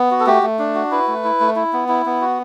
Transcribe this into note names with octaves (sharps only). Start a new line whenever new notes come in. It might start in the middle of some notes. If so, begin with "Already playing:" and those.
Already playing: B3
F#4
A4
A3 G4
A3
D4
F#4
E4 B4
A3
E4
A3
E4
B3
E4
B3
F#4